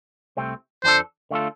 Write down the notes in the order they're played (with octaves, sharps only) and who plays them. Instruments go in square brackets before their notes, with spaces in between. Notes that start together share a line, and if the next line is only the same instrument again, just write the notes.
[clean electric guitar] C2 C3 A3 C4
[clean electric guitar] F2 F3 D4 A4 [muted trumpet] C5
[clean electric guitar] D3 A3 F4 A4